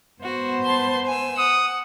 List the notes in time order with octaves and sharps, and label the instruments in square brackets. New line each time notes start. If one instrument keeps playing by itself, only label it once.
[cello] B3 C5 [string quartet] F#4
[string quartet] A5 C6
G#5 E6
[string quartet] F#5 [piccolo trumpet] D#6